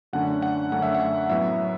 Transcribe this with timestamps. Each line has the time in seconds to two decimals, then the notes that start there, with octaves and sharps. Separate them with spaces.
0.13 F#2 D3 A3 C#4 F#5
0.42 F#5
0.72 F#2 D3 A3 C#4 F#5
0.82 E5
0.95 F#5
1.30 A2 F#3 B3 E5